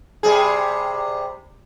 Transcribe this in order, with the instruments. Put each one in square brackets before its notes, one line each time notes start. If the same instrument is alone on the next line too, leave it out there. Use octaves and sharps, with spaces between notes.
[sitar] C3 G3 G#4